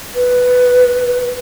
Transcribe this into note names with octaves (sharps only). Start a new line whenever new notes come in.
B4